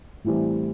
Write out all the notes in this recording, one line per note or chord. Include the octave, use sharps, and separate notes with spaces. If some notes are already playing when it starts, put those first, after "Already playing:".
A1 A2 E3 G3 C4